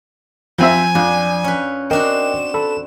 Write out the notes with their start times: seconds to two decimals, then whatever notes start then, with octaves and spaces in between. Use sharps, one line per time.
0.58 F2 F3 C4 E5 G#5
0.95 F2 D4
1.44 C#4 B4
1.91 C4 D4 F#4 A#4 D#5 G5 E7
2.54 A4 B5